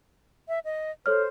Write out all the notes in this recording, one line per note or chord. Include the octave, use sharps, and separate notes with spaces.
E5
D#5
A4 C5 C#5 F6